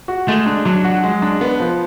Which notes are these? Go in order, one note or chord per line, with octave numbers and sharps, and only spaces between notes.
F#4
G#3 A3
D4
F#3 D4
F#4
G#3
D4
B3
F3